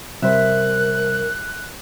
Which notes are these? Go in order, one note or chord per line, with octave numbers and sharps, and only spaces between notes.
C3 G3 A#4 C5 E5 F#6